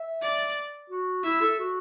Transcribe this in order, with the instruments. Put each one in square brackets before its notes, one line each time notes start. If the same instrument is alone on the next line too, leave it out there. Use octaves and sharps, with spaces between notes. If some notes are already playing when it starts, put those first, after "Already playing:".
Already playing: [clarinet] E5
[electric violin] D5
[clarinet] F#4
[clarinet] E4 [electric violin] E5
[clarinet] A4
F#4